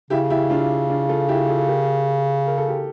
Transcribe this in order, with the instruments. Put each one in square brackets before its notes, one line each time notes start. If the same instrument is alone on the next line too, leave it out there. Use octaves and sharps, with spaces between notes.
[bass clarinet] C#3 [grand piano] E4 G4
[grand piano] E4 G4
D4 F4
D4 F4
F4 A4
E4 G4
F4 A4
G4 A#4
A#4
A4
G4